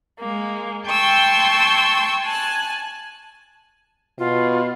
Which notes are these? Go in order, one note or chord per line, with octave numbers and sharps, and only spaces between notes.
G#3 A#3
G5 A5 C6 C#6 E6 G#6
G#5 A5 F#6
B2 F4